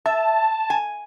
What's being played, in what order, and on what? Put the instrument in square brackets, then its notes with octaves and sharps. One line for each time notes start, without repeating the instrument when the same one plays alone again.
[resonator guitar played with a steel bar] E5 [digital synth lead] A5
[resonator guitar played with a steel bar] G#5